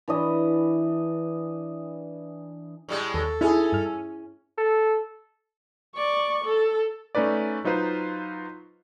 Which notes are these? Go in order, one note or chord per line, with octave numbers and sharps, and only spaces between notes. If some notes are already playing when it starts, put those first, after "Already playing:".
E3 D4 D#5
A2 G3 G#3
D#2 A4
C#4 D#4 E4 G#4
G2 F6
A4
D5 C#6
A4
A3 C#4 D#4 B4 D5
F#3 D#4 F4 B4 C5